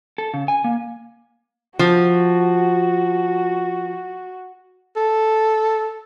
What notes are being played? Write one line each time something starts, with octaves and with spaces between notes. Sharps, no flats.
A4
C#3
G#5
A#3
F3 F#4
A4